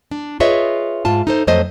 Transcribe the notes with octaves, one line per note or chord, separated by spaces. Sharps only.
D4
F4 G#4 B4 C#5 D#5 E5
G#2 F4 A5
D#4 A4 C5
F2 F#3 A3 C5 D#5